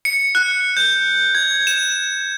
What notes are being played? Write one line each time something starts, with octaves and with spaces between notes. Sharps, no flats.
C#7
F#6
G6
G#6
E7